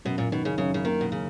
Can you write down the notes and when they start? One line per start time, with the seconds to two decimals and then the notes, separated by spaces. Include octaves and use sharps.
0.05 F#2 B2
0.18 A#2
0.32 B2 D#3
0.45 C#3
0.58 F#2 C#3
0.74 C#3
0.85 D#3 A#3
1.01 B2
1.12 C#3